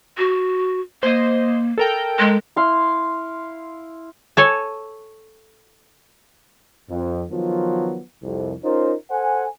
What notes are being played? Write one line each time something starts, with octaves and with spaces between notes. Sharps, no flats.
F#4
A#3 C5 D#5
A4 A#4 G5
G#3
E4 F5 C6
A4 C#5 G#5
F2
D#3 F3 F#3 B3 F4
C2 F2
C#4 D#4 F4 A#4 C5
A4 C5 F#5 G#5